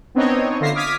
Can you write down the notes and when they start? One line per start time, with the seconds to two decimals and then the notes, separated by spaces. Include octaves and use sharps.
0.15 B3 C4 D4 D#4 C#5 D#5
0.60 D3 F4 E5 A#6 C7
0.75 D6 D#6 F6 G#6 B6